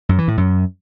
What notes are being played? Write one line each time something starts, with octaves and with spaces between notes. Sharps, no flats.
F#2
E3
A2
F#2